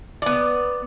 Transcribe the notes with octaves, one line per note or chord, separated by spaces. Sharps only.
B3 D5